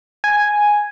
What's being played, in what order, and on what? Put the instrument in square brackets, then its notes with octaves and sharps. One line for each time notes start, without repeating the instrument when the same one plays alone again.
[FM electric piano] G#5